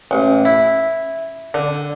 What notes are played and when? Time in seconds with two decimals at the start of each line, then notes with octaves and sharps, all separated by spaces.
0.11 A1
0.45 E4
1.54 D3